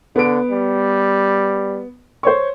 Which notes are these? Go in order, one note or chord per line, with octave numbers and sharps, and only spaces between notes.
D3 B3 D7
G3
C5 C#5 C#6